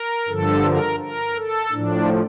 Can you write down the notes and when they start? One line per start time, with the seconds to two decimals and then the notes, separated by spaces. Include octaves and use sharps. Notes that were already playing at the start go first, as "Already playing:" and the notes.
Already playing: A#4
0.29 G2 D3 F3 A4
0.64 A#4
1.00 A#4
1.36 A4
1.72 A2 F3 D4